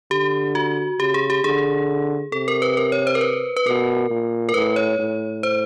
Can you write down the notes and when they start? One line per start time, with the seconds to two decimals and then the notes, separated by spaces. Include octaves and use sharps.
0.11 D3 G4
0.55 F#4
1.00 C#3 G4
1.14 G#4
1.30 G4
1.44 D3 G#4
2.32 C3 A4
2.48 A#4
2.62 B4
2.77 A#4
2.92 C#5
3.07 C5
3.15 A#4
3.21 B4
3.56 B4
3.66 B2 A#4
4.10 A#2
4.49 A#4
4.54 A2 B4
4.76 C#5
4.99 A2
5.43 C5